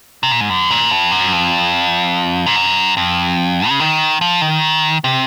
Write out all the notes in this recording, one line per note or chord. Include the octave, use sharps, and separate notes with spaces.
C3
A#2
G#2
F#2
A#2
F2
F#2
F2
G#2
F#2
F2
C#3
D#3
F3
D#3
C3